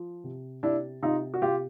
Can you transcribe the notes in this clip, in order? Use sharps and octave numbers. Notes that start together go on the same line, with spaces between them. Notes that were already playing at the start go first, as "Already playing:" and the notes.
Already playing: F3
C3
C3 D4 E4
C3 D#4 F4
F#4
C3 F4 G4